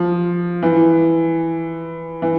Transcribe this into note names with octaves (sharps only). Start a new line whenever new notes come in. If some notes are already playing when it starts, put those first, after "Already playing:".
Already playing: F3
E3
E3